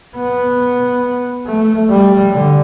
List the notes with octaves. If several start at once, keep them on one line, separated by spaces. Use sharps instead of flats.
B3
A3
G3
D3